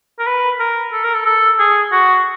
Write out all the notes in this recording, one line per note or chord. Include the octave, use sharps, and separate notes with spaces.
A#4
B4
A#4
A4
A#4
A4
A4
G#4
F#4